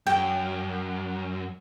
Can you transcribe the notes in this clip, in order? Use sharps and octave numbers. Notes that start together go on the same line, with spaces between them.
F#2 G5